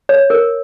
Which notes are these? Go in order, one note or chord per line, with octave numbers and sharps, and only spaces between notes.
C#5
A#4